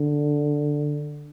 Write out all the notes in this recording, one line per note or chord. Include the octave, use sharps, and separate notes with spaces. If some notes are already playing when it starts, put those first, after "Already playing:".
Already playing: D3